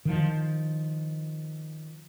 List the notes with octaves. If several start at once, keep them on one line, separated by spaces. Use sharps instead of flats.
D#3 F3